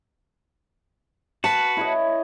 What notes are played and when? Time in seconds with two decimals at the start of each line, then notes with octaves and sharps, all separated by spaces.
1.44 F#4 B4 A5
1.77 E4 C#5 D#5